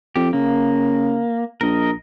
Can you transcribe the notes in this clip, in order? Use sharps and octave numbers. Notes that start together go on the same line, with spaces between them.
F2 G4
C#3 A#3
A#1 A#4 D#5